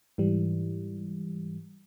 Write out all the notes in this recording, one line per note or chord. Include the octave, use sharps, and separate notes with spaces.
G#2 E3 G3